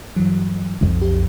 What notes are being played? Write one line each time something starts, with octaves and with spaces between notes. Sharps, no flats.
G2 E3 F#3
B1 F2
G4